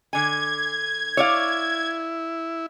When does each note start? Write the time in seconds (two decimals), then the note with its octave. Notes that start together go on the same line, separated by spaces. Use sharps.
0.13 D3 G#5 G#6
1.17 E4 C#5 D5 F5